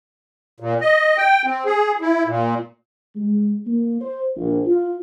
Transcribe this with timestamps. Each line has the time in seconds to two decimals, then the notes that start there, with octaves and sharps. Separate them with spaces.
0.60 A#2
0.81 D#5
1.17 G5
1.45 C4
1.65 G#4
2.01 E4
2.27 A#2
3.16 G#3
3.66 A#3
4.01 C5
4.36 A#1
4.66 F4